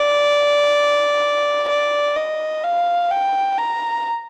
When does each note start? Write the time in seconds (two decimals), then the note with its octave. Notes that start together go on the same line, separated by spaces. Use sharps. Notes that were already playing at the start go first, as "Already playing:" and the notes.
Already playing: D5
1.70 D5
2.17 D#5
2.64 F5
3.11 G5
3.59 A#5